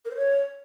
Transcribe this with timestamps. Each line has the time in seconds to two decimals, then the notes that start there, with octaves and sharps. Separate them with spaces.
0.05 A#4
0.11 C5
0.16 C#5